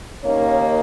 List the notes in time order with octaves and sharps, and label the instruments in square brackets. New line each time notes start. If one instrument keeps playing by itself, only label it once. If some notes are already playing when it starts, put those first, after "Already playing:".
[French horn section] D#2 D#3 A#3 C#4 C#5